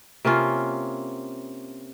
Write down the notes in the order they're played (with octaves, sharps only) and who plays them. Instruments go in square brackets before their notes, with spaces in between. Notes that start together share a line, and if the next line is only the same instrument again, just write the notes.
[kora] C3 A#3 C#4 F4